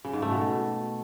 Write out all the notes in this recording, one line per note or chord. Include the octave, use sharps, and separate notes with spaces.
C#3
G#2
A3
B2